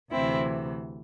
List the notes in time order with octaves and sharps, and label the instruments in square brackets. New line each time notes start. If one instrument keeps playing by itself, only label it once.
[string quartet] D2 C3 E3 C4 E4